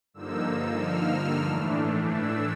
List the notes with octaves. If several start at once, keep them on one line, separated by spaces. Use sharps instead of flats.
G2 D3 F3 A#3 D#4 E6
F6
F6
A2 E3 A3 D4
E6